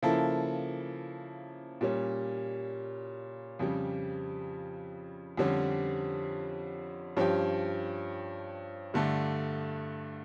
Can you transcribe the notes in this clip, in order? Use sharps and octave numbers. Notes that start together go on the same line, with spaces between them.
C#3 F3 A#3 E4 A4
A#2 G3 C#4
F2 C#3 G3
F2 D3 G3 C#4
G2 F3 C#4 G4
G2 D3 A3 D4